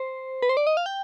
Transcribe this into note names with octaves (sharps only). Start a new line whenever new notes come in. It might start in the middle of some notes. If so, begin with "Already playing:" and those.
Already playing: C5
B4
C5
D5
D#5
F5
G5